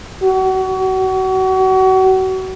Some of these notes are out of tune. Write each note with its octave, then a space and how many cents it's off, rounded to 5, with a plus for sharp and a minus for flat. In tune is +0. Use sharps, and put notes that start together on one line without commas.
F#4 +30